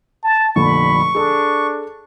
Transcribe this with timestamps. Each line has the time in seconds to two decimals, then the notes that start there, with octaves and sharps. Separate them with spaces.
0.23 A5
0.56 F1 A#2 D3 B5 C#6
1.14 D4 G#4 A4